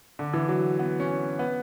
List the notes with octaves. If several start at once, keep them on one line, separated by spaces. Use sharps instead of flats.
D3
E3
F#3
B3
C#4
B3